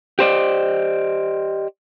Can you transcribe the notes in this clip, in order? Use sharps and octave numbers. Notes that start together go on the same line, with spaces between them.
G4 C5 D5 D#5